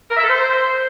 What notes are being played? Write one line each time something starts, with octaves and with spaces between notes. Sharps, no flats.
A#4
E5
A4
C5